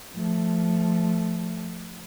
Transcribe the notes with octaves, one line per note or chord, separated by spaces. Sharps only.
F3 A3